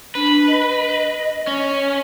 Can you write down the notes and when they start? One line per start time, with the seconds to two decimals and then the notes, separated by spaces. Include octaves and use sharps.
0.15 D4 B4
0.47 D#5
1.47 C#4